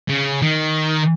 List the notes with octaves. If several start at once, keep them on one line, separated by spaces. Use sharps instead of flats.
C#3
D#3